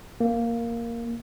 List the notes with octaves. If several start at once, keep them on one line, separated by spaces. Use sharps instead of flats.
A#3